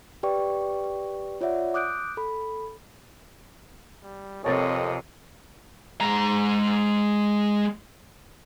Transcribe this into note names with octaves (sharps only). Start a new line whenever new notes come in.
G4 B4 D5 G5 C#6
F4 C#5 D5 E5 F#5
D6 D#6 F#6 G6 D7
A4 B5
G3
F2 C3 C#4 A4 A#4 D#5
G#3 A#5